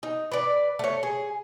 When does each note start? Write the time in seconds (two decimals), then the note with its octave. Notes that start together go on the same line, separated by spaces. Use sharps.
0.03 D#4
0.32 B4 D5
0.79 A3 C#5
1.03 G#4